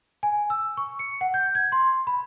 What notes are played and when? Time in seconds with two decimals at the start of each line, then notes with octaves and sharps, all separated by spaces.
0.23 G#5
0.50 E6
0.77 C#6
0.99 C#7
1.21 F#5
1.34 G6
1.55 G#6
1.72 C6
2.07 B5